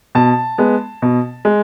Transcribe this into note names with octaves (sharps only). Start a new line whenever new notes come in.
B2 A5
G#3 B3
B2
G#3